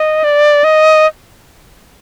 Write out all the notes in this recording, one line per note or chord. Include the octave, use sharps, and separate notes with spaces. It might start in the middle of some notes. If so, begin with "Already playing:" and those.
Already playing: D#5
D5
D#5